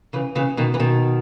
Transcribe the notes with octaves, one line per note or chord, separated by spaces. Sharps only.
C#3 E3
C#3 E3
B2 D#3
E3
B2 D#3